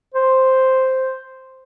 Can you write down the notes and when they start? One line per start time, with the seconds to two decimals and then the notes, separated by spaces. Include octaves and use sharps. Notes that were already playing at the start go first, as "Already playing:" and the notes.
0.14 C5